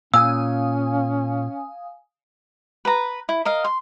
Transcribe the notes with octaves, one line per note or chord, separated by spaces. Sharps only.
A#2 C#4 F5 G#5 D#6 E6
B4 A#5
E4
A#4 D#5 F5
C6